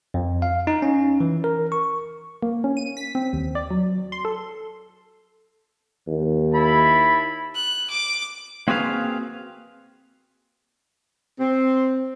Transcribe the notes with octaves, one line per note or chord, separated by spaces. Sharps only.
F2
F5
D#4
C#4
E3
A#4
C#6
A#3
C#4
D#7
B6
C4
D#2
D5
F#3
C6
A4
D#2
E4 A5 B5
F#6
D6
A#3 C4 F#4 G#4 B4 F5
C4